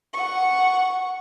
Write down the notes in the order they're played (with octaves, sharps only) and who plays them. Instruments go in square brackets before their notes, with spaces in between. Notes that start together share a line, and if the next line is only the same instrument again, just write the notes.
[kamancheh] F#5 C#6